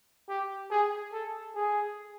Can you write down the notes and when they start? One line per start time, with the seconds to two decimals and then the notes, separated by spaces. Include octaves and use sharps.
0.29 G4
0.71 G#4
1.13 A4
1.55 G#4